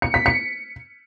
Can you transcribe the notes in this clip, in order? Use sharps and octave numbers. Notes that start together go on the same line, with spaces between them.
C#7
B6
C#7